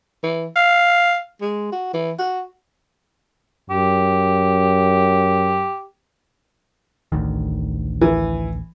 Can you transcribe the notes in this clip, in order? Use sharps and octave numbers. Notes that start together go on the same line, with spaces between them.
E3
F5
G#3
F#4
E3
F#4
F#2 G4
A1 D2 D#3
E3